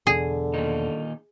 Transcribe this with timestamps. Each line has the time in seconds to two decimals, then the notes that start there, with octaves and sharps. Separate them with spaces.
0.07 E2 B2 D3 G#4
0.54 A#2 D#3 D#4